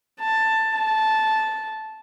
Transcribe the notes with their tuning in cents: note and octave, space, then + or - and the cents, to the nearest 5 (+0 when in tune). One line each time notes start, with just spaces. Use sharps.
A5 +10
A5 -10